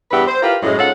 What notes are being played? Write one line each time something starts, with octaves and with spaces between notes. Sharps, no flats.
E2 G2 G4 B4 E5 F#5
C5
E4 F4 G4 A#4 B4 F5
F#2 A2 G#3
G#2 C#4 F4 A4 F#5